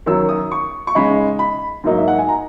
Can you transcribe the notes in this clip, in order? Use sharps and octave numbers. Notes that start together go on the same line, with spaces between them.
F#2 D#3 F#3 E6
D#6
C#6
C#6
C#3 G#3 D#4 B5
B5
G#2 F#3 A#3 D#4
E5
F#5
G#5
A#5